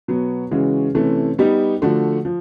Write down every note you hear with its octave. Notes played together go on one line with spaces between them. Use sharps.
B2 F#3 B3
C#3 E3 G#3 C#4 F#4
C3 E3 A3 C#4
G3 B3 D#4 G4
D3 F3 A3 D4 F#4
F3